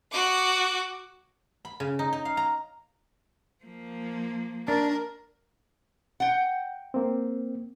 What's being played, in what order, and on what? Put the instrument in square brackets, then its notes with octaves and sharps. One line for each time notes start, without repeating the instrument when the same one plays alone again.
[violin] F#4 D6
[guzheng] B5
C#3
D#4
D#4
F5
A#5
[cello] F3 A#3
[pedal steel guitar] D4 [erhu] A#4
[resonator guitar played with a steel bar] F#5 G5
[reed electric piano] A#3 C4